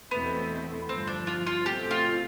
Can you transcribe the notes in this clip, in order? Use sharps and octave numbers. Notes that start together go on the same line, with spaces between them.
E2 B2 A3 B3 C4 E4
G1 G2 F3 C4
D4
F4
F4
B2 A3 C4 G4
F4